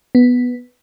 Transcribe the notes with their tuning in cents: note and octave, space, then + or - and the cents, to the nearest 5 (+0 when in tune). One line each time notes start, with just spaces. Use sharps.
B3 +0